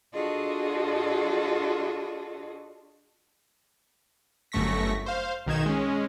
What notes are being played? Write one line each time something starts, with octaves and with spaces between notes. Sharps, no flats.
D4 F4 F#4 G#4 A4 D#5
G1 F#2 A3 C#6 A#6 B6
C5 F5
B1 D#3 D#4 G#6 E7
G#3 C#4